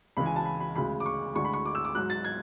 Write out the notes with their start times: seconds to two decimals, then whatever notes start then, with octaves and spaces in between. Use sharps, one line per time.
0.17 C#2 C#3 E3 G#3 B5
0.26 G#5
0.36 A5
0.45 B5
0.60 B5
0.76 D2 C#3 G#3 B5
1.00 D6
1.06 C#6
1.35 D2 D3 G#3 C#6
1.45 B5
1.53 C#6
1.65 D6
1.75 E6
1.85 D6
1.95 G#2 F#3 F#6
2.10 A6
2.25 G#6